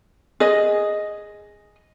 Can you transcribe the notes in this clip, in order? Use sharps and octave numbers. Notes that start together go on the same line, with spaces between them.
G#4 D#5